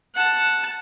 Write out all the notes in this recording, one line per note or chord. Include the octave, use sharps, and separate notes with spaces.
F#5 A5